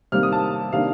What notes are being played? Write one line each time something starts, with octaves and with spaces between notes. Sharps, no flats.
C3 D#3 G3 A#3 F6
D#6
A5
C3 D#3 A#3 D4 F5